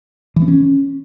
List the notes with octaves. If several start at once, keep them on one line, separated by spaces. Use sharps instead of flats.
E3
C4
C#4